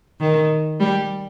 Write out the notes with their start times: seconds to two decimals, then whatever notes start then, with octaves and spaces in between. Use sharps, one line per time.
0.20 D#3
0.80 G3